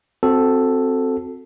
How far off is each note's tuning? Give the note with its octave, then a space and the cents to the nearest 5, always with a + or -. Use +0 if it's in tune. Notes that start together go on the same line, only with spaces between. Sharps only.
C4 +0 F#4 -20 A4 +0